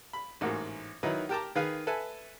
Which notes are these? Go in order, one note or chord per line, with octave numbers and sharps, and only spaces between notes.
B5
A1 G#2 A#3 F#4
D#3 F#3 D#4 E4 B4
G4 A#4 G5 A5 A#5 D6
D#3 G#4 B4 F5
A4 B4 E5 G#5